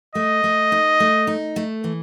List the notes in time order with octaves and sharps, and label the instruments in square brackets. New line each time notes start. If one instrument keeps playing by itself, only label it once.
[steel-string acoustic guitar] A3 [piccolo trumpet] D#5
[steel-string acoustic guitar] A3
D#4
A3
D#4
A3
E3